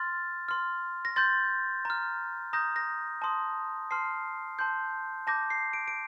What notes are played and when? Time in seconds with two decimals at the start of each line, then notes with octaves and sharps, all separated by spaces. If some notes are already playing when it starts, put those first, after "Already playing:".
Already playing: C6 F6 A6
0.48 C6 F6
1.05 A#6
1.16 C6 G6 A6
1.85 A#5 F6
2.53 A#5 D#6 G6 A#6
2.76 A#6
3.22 A5 C6 D#6
3.91 A5 C6 F6 C7
4.59 A5 C6 G6
5.27 A5 D6 G6 A#6
5.50 C7
5.73 D7
5.88 D7